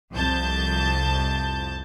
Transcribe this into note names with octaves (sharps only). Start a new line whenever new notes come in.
C2 F2 A5 G6